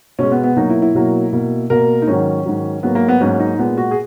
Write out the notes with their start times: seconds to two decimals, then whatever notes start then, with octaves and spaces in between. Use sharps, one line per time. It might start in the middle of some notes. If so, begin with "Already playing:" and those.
0.19 B2 G#3 C#4
0.32 B3
0.44 B3
0.56 B2 F#3 A#3 D#4
0.70 E4
0.82 E4
0.95 B2 F#3 A#3
1.33 B2 A#3
1.70 B2 A#3 A#4
2.02 D#4
2.07 G#2 D#3 F#3 C#4
2.45 G#2 D#3 F#3
2.83 G#2 F#3 A#3 B3
2.95 A#3
3.08 B3
3.20 G#2 F#3 A#3 C#4
3.40 D#4
3.59 A#2 G#3 B3
3.78 F#4
3.91 G#4